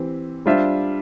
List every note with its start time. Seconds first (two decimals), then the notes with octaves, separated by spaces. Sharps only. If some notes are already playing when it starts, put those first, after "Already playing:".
Already playing: E3 C4 G4
0.46 G3 D4 F4 C5 E5